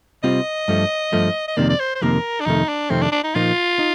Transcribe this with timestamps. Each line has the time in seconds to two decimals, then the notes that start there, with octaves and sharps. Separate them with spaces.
0.23 C3 G3 C4 F4 D#5
0.68 G2 F3 A3
1.13 G2 F3 A3
1.48 D#5
1.57 F2 C3 D#3 A#3 D5
1.69 D5
1.80 C5
1.95 C5
2.02 F2 C3 D#3 A#3 A#4
2.40 D4
2.46 F2 C3 D#3 A3 D#4
2.69 D4
2.90 F2 C3 D#3 A3 C4
3.01 D4
3.12 D4
3.24 D#4
3.35 A#2 F3 A#3 D#4 F4
3.79 D#4